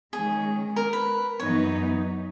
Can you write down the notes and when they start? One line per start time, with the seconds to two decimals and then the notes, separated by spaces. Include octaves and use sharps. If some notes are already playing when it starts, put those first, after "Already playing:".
0.13 D#3 G#3 C#4 G#4
0.76 A#4
0.93 B4
1.40 F#2 E3 B3 D#4 C#5